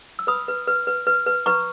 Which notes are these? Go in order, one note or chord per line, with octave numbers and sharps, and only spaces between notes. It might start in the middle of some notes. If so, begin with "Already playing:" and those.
E6
B4 B5 D#6
B4
B4
B4
B4
B4
B4 A#5 C#6